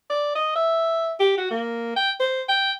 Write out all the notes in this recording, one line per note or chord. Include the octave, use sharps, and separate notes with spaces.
D5
D#5
E5
G4
F#4
A#3
G5
C5
G5